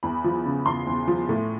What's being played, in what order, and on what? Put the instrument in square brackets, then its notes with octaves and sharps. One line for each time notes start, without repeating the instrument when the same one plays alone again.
[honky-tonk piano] E2 B5
F3
C#3
E2 C6
E2
F3
A2